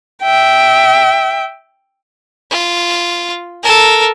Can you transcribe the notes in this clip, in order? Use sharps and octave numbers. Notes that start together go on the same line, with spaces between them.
E5 G5
F4
A4 A#4